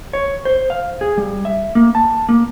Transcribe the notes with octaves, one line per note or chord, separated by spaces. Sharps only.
C#5
C5
F5
G#4
G3
E5
A#3
A5
A#3